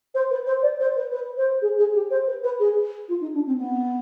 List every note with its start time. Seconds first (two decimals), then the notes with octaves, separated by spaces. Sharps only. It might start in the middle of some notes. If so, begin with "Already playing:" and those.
0.14 C5
0.30 B4
0.46 C5
0.62 D5
0.80 C5
0.96 B4
1.11 B4
1.37 C5
1.61 G#4
1.78 G#4
1.94 G4
2.10 C5
2.27 B4
2.43 B4
2.59 G#4
3.08 F4
3.20 D#4
3.34 D4
3.46 C4
3.57 B3